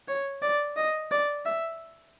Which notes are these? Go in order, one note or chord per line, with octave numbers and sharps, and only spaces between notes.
C#5
D5
D#5
D5
E5